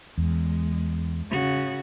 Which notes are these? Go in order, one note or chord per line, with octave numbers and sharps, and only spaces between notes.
E2 G#3
C#3 F#4